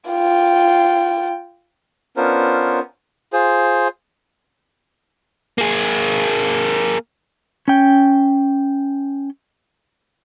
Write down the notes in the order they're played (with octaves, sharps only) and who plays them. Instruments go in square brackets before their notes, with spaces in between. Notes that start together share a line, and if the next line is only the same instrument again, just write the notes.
[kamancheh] F4 G5
[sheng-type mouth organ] B3 C#4 D4 F4 A#4 C5
[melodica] F4 G#4 C5
[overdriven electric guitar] A#3 G#4
[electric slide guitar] C#4 G5